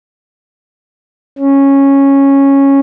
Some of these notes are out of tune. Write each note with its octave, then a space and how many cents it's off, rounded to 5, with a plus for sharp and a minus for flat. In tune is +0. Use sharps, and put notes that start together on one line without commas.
C#4 -10